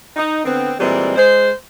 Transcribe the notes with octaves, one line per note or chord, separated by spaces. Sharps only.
D#4
D3 B3 C4
A#2 E3 G3 G#3 C4
G#3 C5